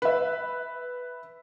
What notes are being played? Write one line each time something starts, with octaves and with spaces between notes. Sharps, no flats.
B4 E5